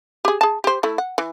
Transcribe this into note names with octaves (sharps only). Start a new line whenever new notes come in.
G4 G#4
G#4 A5
G4 C5
A3 E4
F#5
E3